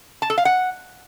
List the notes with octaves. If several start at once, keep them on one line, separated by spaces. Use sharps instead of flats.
A5
A4
F5
F#5